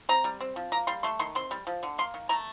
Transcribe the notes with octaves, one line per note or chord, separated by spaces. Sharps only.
C4 A#5
G3
C4
F3
A#3 A#5
G3 C6
A3 C6
D#3 C6
C4 C6
G3
F3
D3
A#3 C6
D#3
A3 A#5